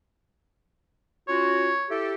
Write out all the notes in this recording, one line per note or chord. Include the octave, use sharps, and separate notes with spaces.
C#4 F4 F#4 C#5
E4 G4 A4